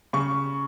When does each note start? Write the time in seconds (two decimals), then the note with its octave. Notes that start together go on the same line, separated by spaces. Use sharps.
0.13 C#3 C#6